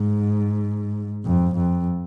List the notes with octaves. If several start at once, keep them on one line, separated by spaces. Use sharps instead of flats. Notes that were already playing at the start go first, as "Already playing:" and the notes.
Already playing: G#2
F2
F2